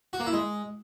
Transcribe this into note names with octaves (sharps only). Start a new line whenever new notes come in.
F#4
A#3
E4
G#3